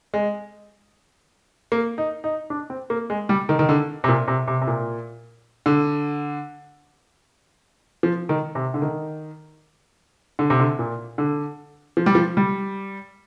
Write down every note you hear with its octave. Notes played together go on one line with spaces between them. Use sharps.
G#3
A#3
D#4
D#4
D4
C4
A#3
G#3
G3
D#3
D#3
D3
C3
A#2
C3
C3
C3
A#2
D3
F3
D#3
C3
D3
D#3
D3
C3
D3
A#2
D3
F3
G3
F3
G3